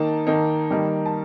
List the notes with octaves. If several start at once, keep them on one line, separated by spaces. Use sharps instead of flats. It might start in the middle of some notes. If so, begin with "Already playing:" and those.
Already playing: D#3 A#3 D#4 A5
D#3 A#3 D#4
D#3 G3 A#3 D#4
A5